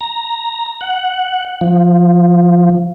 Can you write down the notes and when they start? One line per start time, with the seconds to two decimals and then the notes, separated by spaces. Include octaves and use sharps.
0.01 A#5
0.81 F#5
1.61 F3